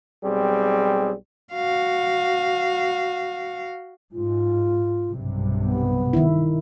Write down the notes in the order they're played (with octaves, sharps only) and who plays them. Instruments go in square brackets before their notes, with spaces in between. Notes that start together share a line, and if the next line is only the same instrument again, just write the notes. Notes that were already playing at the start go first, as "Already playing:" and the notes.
[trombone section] B1 G3 C4 G#4
[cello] F#4 F5
[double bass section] G#2 [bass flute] F4
[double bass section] B1 G2 C3
[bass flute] B3
[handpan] D#3 E4